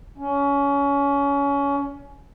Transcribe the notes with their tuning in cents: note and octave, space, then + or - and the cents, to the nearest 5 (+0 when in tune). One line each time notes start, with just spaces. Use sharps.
C#4 +25